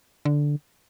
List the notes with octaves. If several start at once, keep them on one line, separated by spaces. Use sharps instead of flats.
D3